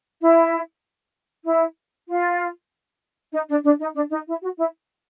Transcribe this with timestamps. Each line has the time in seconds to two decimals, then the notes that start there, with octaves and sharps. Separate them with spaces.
0.19 E4
1.44 E4
2.07 F4
3.32 D#4
3.48 D4
3.63 D4
3.78 D#4
3.93 D4
4.10 D#4
4.26 E4
4.41 F#4
4.56 E4